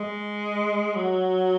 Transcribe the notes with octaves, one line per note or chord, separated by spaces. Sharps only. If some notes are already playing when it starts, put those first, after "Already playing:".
Already playing: G#3
F#3